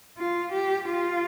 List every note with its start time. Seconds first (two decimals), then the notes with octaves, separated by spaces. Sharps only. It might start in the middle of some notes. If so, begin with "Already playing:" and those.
0.17 F4
0.53 G4
0.88 F4